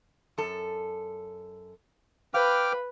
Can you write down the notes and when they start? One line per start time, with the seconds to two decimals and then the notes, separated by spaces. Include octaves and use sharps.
0.38 F#2 A4
2.34 B4 F5 G5 D6 F6